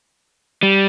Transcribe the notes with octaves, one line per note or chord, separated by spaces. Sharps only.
G3